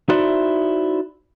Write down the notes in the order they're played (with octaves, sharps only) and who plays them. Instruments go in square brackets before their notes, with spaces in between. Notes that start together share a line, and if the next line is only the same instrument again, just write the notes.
[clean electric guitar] D#4 E4 F#4 C5 D5 E5